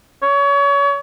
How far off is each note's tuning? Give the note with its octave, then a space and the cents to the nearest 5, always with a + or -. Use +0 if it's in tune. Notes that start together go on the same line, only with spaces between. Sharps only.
C#5 +30